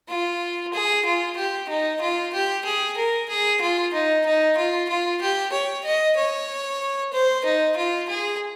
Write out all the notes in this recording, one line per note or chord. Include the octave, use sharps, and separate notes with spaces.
F4
G#4
F4
G4
D#4
F4
G4
G#4
A#4
G#4
F4
D#4
D#4
F4
F4
G4
C#5
D#5
C#5
C5
D#4
F4
G#4